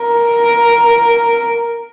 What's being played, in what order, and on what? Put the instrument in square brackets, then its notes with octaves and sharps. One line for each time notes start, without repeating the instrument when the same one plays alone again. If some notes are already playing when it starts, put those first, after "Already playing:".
Already playing: [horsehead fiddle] A#4